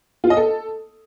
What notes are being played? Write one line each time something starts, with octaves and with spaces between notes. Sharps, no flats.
F4
D#5
A4